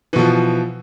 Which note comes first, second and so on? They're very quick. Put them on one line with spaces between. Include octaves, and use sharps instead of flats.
E3 B2 F3